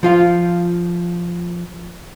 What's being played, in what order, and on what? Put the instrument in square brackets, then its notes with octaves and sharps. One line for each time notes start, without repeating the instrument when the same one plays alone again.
[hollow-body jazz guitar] F3 F4 F5